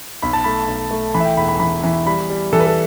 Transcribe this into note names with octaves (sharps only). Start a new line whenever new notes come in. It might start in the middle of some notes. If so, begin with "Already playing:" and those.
B1 B5
A5
A3 B5
B1
A3
E3 B5
E5
G5
E1 B5
B5
E3 B5
E3
G3 B5
G3
E3 A4
B4
A4